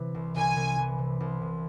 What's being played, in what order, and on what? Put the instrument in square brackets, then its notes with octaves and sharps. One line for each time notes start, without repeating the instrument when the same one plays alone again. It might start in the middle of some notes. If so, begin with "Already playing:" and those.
Already playing: [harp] C3 E3
C2
[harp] C2 [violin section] G#5
[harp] C2
E3
C3
C2
C3